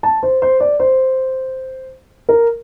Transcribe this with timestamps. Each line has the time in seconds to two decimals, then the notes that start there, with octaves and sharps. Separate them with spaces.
0.03 A5
0.23 C5
0.42 C5
0.60 D5
0.80 C5
2.29 A#4